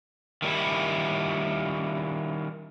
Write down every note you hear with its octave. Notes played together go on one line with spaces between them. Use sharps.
D#3 G3 E4